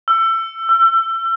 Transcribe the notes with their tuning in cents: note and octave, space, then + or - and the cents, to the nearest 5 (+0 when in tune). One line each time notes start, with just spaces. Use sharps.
E6 +25
E6 +35